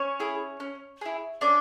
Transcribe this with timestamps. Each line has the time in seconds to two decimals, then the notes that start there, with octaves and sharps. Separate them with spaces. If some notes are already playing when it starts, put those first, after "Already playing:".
Already playing: C#4 C#5
0.20 E4 G#4
0.60 C#4
1.01 E4 G#4
1.41 C#4 D4 D5